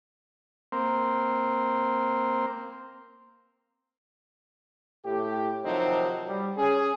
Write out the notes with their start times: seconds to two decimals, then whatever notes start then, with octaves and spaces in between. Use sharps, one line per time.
0.72 A#3 C4
5.05 A2 G4
5.64 C3 D#3 F3 F#3 C4 D#4
6.28 G3
6.57 C#4 G#4